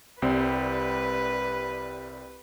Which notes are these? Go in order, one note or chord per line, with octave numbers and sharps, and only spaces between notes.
C2 G3 C4 B4